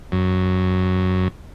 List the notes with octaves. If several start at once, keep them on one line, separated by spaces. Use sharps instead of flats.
F#2